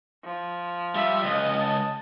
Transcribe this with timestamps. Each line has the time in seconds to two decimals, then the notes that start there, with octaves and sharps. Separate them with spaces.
0.25 F3
0.95 G3 F4 E5
1.24 C#2 D#5
1.60 A5